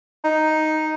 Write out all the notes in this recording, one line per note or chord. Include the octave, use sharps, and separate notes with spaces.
D#4